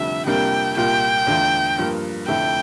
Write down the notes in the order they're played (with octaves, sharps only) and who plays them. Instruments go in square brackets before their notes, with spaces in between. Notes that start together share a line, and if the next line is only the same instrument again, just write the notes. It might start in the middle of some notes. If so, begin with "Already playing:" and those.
Already playing: [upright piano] F1 F2 D3 G3 [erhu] E5
[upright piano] F2 C3 G3 A#3 D4 [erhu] G5
[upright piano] C2 A#2 G3 A#3 F4 [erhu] G5
[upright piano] E2 D3 A3 D4 F4
G2 F3 A#3
[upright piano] F1 F2 D3 A3 E4 [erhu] G5